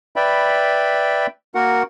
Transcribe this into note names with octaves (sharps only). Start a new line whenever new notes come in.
B4 D5 E5 G5 B5
A#3 F#4 A#4 F#5